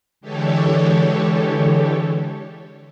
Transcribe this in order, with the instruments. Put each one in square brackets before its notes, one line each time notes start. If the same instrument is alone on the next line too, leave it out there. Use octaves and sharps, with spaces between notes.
[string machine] D3 E3 G#3 G4 A4 C#5